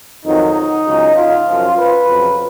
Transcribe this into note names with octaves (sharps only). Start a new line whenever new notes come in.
F2 D#3 F#3 D#4
C#2 C#3 F#3
F4
F#2 F3
B4
F2 C#3 F#3